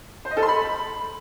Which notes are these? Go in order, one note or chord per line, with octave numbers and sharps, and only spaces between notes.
C5
D#5
A4
C6
B5